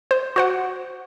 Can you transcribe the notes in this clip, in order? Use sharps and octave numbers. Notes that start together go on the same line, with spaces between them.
C5
F#4 C5 F#5